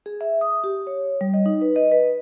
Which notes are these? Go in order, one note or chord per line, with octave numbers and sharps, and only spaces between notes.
G#4
E5
D#6
G4
C#5
G3
D#5
D#4
B4
D#5
B4